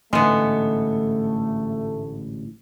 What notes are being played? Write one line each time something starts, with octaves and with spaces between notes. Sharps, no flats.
A1 G#2 D3 G#3 A3 B3